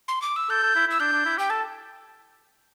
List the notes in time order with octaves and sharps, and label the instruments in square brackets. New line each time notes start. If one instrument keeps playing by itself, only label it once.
[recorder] C6
D6
E6
[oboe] A4 [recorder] G6
[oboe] A4
E4
[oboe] E4 [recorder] E6
[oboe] D4 [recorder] G6
[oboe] D4
E4
[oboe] G4 [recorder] G5
[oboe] A4 [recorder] A5